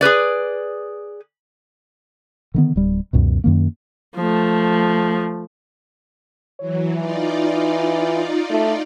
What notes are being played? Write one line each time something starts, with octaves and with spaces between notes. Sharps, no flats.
G#4 A#4 B4 D5
D3 D#3 B3
D1 G3
C#2 F#2 B2
F#2 D#3 A#3
F3 A3
E3 F#3 C#5
E3 D#4 F4 D5
A3